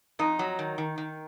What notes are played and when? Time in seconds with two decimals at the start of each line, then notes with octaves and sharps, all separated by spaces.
0.19 F2 D#4
0.39 F#3
0.59 D#3
0.78 D#3
0.98 D#3